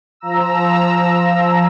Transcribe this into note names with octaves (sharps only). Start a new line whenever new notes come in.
F3 A#5 E6